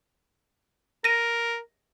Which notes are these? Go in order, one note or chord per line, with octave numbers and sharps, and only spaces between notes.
A#4 A#6 D#7